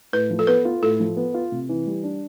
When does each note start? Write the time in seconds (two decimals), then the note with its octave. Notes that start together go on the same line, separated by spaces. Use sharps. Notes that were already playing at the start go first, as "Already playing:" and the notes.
0.13 A2 B4
0.30 F3
0.39 A4
0.47 B3 B4
0.65 F4
0.82 A2 A4
1.00 F3
1.17 B3
1.34 F4
1.52 C3
1.69 E3
1.86 G3
2.04 D4